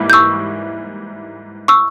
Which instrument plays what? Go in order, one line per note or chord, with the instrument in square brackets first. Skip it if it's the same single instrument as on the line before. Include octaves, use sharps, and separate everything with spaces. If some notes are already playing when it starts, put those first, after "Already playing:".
Already playing: [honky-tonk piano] G#2 E3 G3 A#3 E4
[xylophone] G6
C#6 E6
C#6 E6